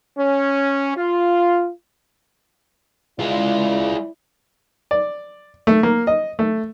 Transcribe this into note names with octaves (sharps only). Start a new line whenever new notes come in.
C#4
F4
G#3 E4 F4 D5
D5
A3
A#3
D#5
A3